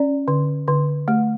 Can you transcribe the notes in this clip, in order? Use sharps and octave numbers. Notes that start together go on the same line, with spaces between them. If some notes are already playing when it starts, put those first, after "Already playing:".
Already playing: C#4 D5
D3
D3
A3